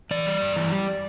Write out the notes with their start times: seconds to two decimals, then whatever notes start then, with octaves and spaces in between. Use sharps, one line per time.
0.11 E3 D5
0.26 G3
0.42 G2
0.56 E3
0.71 G3